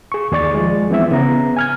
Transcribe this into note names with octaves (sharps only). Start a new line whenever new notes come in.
G#4 C#6
D#2 G#4 D5 C#6 A6
F3 G#3
E3 B3 C4 E4 E5
C#3 B3 A#5
G#5 F6 G#6